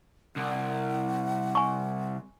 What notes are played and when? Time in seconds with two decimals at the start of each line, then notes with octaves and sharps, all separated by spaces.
0.36 C2 F#5
1.55 G#5 C#6